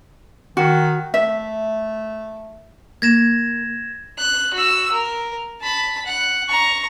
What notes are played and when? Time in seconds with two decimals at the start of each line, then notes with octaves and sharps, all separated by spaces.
0.57 D#3 F#4
1.14 A3 E5
3.02 A#3 G#6 A#6 E7
4.18 F#6
4.54 F#4 E6
4.91 A#4
5.61 A5 B5
6.05 F#5
6.49 A#5 C#6